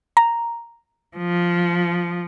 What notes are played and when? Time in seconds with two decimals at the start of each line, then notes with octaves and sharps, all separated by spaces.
0.17 A#5
1.18 F3